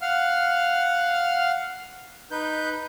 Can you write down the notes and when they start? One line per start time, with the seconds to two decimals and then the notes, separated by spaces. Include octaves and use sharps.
0.02 F5 F#5 F6
2.31 D#4 B4 G6